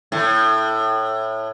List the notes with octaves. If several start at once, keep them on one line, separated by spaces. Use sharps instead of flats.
A2